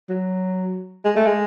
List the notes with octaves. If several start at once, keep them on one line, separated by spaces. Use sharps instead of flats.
F#3
G#3
A3
G#3